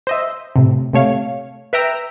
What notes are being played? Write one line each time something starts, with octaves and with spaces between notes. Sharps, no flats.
C5 D#5 E5
A2 C3
C3 A3 C#5 F5
B4 E5 G5 A#5 E6